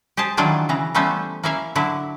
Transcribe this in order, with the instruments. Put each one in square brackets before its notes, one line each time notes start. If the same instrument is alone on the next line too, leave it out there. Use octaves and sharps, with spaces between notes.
[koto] G4 G#4 C5 A5
D#3 E3 F#3 D4 F4 G#4
C#3 E3 A#5
G3 A3 B3 C#4 C5 E5
A#3 C#4 E4 E5 F5
D3 F#3 E4 E5